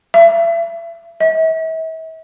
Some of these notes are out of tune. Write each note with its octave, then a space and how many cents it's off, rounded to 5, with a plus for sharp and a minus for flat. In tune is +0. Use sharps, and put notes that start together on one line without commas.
E5 +35
E5 -40